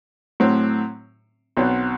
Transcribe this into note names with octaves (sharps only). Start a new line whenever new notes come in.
A2 F#3 C4
B1 B2 F#3 C4